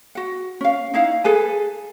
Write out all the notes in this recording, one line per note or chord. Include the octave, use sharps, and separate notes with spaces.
F#4 F#5
C#4 F5
D#4 E4 F5 F#5
G#4 A4 B4 G#5